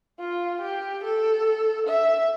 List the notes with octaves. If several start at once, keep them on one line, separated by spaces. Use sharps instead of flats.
F4
G4
A4
E5